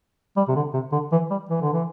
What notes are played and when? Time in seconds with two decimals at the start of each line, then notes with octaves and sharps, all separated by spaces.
0.37 G3
0.48 C3
0.56 D3
0.74 C3
0.92 D3
1.12 E3
1.31 G3
1.49 E3
1.61 D3
1.73 E3